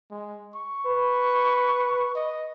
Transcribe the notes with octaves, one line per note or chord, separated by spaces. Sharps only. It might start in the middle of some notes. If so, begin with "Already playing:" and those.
G#3
C#6
B4
D#5